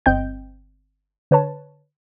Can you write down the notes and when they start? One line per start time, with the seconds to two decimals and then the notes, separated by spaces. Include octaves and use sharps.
0.06 G1 C4 D#5 G5 G6
1.31 D3 B4 C#5 A5